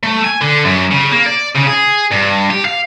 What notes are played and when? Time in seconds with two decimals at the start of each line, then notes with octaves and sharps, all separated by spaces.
0.03 A3
0.25 G#5
0.41 D3
0.65 F#2
0.91 C#3
1.11 A#3
1.26 D5
1.55 C#3
1.67 G#4
2.12 G2
2.50 G4
2.65 F5